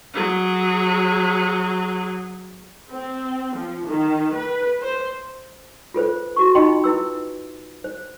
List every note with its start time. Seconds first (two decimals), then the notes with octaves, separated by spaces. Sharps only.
0.14 F#3 G#4
2.91 C4
3.56 F3
3.87 D#3
4.35 B4
4.82 C5
5.94 F4 A4 B4 C5
6.36 F#4 C#6
6.55 D#4 F4 D#5 G5 B5 C6
6.84 E4 B4 E6
7.84 C5